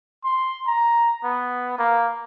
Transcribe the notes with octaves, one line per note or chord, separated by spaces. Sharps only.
C6
A#5
B3
A#3